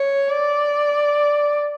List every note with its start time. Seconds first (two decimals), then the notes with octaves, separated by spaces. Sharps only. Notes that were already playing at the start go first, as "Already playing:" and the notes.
Already playing: C#5
0.30 D5